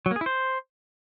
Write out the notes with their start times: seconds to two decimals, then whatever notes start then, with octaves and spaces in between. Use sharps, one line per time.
0.06 F#3
0.11 A#3
0.16 G#4
0.21 E4
0.26 C5